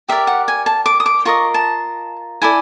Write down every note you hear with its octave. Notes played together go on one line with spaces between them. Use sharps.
G4 A#4 D5 E5
F#5
G#5
A5
D6
D#6
D6
F4 A#4 D#5 C#6
A5
E4 A4 D5 G#5